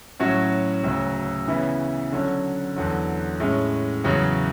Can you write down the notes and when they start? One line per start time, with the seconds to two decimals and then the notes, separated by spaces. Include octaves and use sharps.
0.19 A2 F#3 C#4 F#4
0.84 D2 C#3 F#3
1.48 C#3 E3 B3 E4
2.12 D3 F#3 C#4
2.76 E2 D3 F#3
3.40 A2 G#3 C#4
4.04 E2 C#3 F#3 C#4